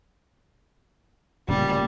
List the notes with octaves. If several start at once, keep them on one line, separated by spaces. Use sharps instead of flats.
D1 A#2 C#3 G3 C#4